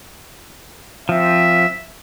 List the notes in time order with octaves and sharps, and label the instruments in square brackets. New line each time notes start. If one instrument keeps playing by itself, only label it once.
[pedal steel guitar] F3 C4 [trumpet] E5